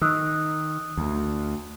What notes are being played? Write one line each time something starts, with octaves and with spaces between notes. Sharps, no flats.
D#3 D#6 E6 F#6
D2